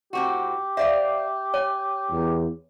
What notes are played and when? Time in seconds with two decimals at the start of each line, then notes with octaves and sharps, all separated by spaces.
0.13 A2 C4 F#4 G4
0.77 C5 D5 E5 F5
1.54 C#5 G#5
2.11 E2